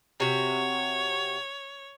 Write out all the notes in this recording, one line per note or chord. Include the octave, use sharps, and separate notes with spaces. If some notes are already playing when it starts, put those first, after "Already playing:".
C3 F#4 C#5